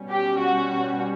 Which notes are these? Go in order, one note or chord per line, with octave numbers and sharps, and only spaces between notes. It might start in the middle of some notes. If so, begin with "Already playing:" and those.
Already playing: B2 G3 C#4
G4
F#4